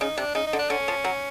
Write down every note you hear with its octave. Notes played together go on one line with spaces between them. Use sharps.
C#3 D#4
C3 D4
C#3 D#4
D#4
D3
D4
D3 C#4
F3
F#3